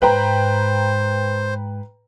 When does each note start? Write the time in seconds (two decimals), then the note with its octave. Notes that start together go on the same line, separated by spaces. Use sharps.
0.02 G#2 B4 C5 G5 A#5